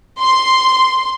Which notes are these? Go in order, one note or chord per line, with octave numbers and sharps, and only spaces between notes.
C6